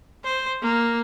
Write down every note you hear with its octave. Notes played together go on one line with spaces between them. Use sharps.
C5
A#3